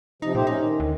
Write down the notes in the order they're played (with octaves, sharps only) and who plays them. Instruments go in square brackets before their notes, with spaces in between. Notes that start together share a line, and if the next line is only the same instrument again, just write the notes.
[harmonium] C3 F3 [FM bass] D#4
[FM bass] A#2 [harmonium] A3 G4 C5
[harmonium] C#4 [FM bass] D#4
[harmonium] D#3
[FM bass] D2